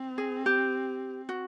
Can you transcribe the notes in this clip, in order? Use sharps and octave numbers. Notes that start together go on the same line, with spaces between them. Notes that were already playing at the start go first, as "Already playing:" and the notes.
Already playing: C4
G#4
G4
F#4